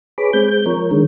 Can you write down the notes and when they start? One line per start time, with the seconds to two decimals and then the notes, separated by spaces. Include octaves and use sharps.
0.18 G#4 B4 C#5 B5 D6
0.33 G#3 C4 G6
0.66 F3 A#4 C#5
0.91 D3 D#3 G#3